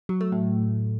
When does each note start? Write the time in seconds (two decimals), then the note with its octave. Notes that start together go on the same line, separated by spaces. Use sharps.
0.09 F#3
0.21 A3
0.32 A2